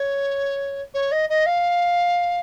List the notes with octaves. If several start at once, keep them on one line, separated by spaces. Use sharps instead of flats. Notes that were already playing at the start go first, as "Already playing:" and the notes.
Already playing: C#5
C#5
D#5
D#5
F5